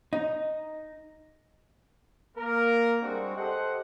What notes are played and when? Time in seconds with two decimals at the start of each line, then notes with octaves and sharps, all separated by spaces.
0.13 D#4
2.37 A#3 A#4
3.02 G3 G#3 C4 D4 F#4
3.37 G4 A4 C5 D#5 F#5